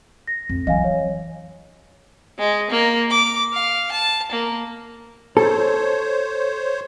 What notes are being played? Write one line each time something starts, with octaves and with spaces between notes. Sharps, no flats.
A#6
F2
E3 F#3 D#5 F5 G#5
C#5
G#3
A#3
D6
F5
A5
A#3
A4 C5 C#5